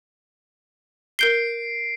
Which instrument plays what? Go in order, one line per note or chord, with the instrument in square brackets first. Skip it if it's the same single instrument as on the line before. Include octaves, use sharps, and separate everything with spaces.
[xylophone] A#4 G6 G7 [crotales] C7 D7